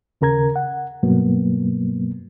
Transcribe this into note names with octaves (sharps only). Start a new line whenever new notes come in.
D#2 C#3 A#4 A#5 G#6
F#5
G2 B2 F#3 A#3 B3